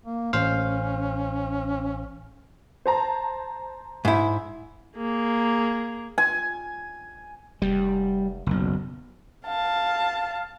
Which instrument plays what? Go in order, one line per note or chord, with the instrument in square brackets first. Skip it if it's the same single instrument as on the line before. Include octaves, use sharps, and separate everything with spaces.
[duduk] A#3
[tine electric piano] A1 C5 F5 [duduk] C#4
[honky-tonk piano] C5 A5 A#5
[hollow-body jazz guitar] G#2 E4
[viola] A#3 G#4
[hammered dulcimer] G#5
[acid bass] F1 [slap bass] G3
[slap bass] F#1 B1
[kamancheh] F5 A5